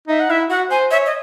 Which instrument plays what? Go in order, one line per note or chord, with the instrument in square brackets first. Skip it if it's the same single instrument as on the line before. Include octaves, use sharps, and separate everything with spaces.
[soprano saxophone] D#4 [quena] E5
[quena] F#5
[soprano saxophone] E4 [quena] E5
[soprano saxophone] F#4 [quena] F#5
[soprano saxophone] C5 [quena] G#5
[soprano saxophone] C#5 [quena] E5
[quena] D#5